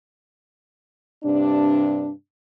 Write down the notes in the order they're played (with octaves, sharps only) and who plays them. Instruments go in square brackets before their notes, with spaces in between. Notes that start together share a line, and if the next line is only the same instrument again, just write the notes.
[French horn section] G2 C3 D4